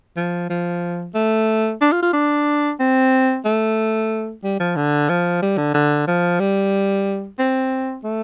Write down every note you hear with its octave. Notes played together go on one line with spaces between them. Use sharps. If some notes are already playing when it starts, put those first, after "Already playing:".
F3
F3
A3
D4
F4
F4
D4
C4
A3
G3
F3
D3
F3
G3
D3
D3
F3
G3
C4
A3